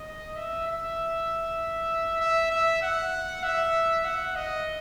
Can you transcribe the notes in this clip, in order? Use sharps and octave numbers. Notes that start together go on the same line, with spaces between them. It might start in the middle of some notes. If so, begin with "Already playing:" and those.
Already playing: D#5
E5
E5
E5
E5
F#5
E5
F#5
D#5